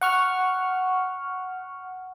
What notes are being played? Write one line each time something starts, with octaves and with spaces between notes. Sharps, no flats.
F#5 C#6 F6